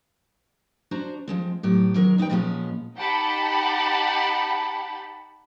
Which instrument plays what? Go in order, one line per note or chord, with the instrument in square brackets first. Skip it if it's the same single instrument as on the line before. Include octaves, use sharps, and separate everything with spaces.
[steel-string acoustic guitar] D4 F#4 C5 A#5
F3 G#3 C4
A2 F#3 B3 G4
D#3 F#3 G#3 A#4
E2 D#4 B4 G5
A#2 F3 G3 G#3 B3 C#4
[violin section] D#4 G4 F#5 G5 A5 B5